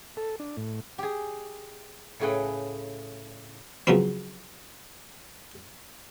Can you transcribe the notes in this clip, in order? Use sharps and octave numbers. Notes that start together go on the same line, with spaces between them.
A4
D4
A2
G4 G#4
A2 C#3 A3 G#4 B4 G5
C#3 F3 F#3 B3 C4